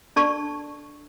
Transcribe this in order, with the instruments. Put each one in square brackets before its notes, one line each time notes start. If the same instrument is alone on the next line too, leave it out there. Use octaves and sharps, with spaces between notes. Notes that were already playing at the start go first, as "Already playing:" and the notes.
[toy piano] D4 A4 D5 A5 C#6